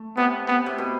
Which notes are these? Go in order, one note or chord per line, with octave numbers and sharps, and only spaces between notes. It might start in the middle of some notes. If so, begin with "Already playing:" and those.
Already playing: A3
C3 B3
B3
C3
B2